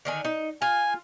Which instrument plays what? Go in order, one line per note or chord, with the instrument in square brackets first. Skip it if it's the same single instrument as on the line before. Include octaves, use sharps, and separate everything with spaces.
[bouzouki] D3 D#3 G#5
D#4
[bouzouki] F4 [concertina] G#5